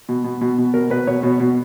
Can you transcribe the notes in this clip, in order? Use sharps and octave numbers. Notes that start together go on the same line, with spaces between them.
B2
B2
B2
B2
B2 A#4
B2 B4
B2 C#5
B2
B2